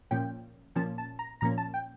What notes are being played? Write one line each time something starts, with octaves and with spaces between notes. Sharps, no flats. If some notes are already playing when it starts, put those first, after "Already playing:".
A#2 F3 A#3 C#4 G5
A#2 F3 A#3 C#4 A5
A5
A#5
A#2 F3 A#3 C#4 A#5
A5
G5